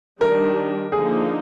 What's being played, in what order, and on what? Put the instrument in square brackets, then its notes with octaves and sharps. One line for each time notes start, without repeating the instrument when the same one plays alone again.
[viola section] D#3 G3 D4 [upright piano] A#4
[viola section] D3 F3 A#3 D#4 [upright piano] G#4